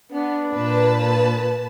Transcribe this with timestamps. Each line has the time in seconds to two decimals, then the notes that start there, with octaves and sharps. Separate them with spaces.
0.12 B3 D4
0.54 A#2 B4 A5